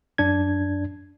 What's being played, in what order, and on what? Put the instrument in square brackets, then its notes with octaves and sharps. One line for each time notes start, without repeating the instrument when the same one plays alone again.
[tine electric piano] F#2 D4 G#6